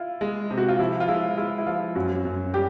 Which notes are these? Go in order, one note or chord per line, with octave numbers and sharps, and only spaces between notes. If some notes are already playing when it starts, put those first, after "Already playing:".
Already playing: E4 F4
G#3
C3
F#4
F4
F3 E4
F4
G#3 E4
G#3 E4
E4
F3 F4
F#2 F#4
F#2
G3 G4